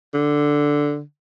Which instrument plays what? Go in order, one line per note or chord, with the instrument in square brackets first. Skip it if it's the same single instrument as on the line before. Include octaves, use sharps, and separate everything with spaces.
[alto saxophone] D3